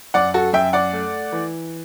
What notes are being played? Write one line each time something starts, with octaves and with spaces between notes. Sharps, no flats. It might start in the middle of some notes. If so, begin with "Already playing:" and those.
F#2 D5 F#5
F#4 A4
F#2 E5 G5
D5 F#5
A3
E3